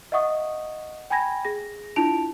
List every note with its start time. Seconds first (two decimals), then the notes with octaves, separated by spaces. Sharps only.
0.12 D#5 E5 F#5 C#6 D#6
1.10 G5 G#5 B5 G#6 A#6
1.45 G#4 A#6
1.96 D4 E4 F4 A5 D7 F7